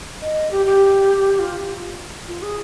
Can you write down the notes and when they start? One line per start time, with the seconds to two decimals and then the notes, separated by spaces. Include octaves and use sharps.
0.22 D#5
0.51 G4
0.66 G4
1.39 F4
2.28 F4
2.42 G#4